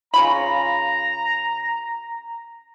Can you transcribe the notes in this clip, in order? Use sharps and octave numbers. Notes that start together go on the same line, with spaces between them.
C#3 F4 A#5 B5